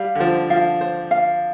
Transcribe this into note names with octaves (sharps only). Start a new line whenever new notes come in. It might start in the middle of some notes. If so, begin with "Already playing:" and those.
Already playing: G3 F5
D3
F3 C5
F3 F5
C5
F5